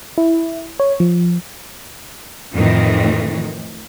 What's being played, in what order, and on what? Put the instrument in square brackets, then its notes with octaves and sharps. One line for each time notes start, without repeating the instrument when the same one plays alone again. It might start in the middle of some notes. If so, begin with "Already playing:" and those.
[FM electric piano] E4
C#5
F3
[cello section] F2 A2 D#3 E3